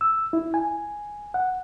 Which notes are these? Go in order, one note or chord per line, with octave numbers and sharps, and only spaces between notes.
E6
E4
G#5
F#5